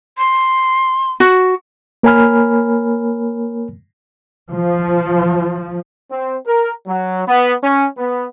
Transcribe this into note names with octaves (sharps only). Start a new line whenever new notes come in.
C6
F#4
A#3 A#4 C#5 G#5 B5 F6
F3
C4
A#4
F#3
B3
C#4
B3